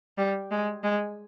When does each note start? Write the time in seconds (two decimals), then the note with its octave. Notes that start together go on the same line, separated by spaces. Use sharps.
0.18 G3
0.51 G#3
0.84 G#3